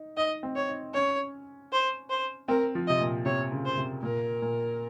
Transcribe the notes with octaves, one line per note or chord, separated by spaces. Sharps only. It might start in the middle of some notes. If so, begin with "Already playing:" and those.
Already playing: D#4
D#4 D#5
C4
C#5
D#4
C#4 C#5
C5
C5
C4 A#4
F3
C3 D#5
A#2
C3 C#5
C#3
C5
C3
A#2 A#4
A#2